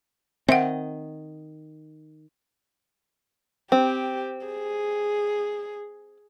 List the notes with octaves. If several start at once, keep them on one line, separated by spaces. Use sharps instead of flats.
D#3 C4 D#5 E5 F#5
C4 G4
G#4